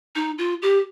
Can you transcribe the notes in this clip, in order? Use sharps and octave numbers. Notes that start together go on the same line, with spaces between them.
D#4
F4
G4